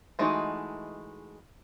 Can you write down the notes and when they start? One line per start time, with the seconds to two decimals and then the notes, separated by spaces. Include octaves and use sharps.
0.19 E3 G#3 A3 D#4 F#4